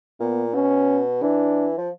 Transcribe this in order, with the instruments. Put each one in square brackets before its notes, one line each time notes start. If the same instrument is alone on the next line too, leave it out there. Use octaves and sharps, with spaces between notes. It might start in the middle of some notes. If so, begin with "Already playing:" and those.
[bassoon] A#2 [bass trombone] B3
[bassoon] B2 [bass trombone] C#4
[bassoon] E3 [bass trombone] D4
[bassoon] F3